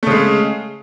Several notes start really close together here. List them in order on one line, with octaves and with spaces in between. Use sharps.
A3 C#3 G#3